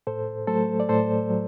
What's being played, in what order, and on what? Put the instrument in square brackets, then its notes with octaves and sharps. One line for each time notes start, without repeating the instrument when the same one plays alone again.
[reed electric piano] A2 A4 C5
F#3 A3 A4 C5
D5
A2 A4 C5
F#3